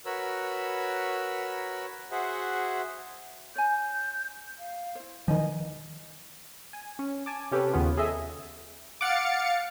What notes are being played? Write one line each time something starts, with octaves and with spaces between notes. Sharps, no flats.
F#4 A#4 B4 C#5 B5 E6
F#4 G#4 C5 E5 F#5
C#5 G#5 G6
F5
E4 C5
D#3 F3 D#5 G#5
G#5
C#4
G#5 A5 D6
C3 C#4 G4 A4 B4
D#2 C#3 B3 C#4 F4
G#4 A4 D#5 E5 G#5
F5 F#5 D6 A6 C#7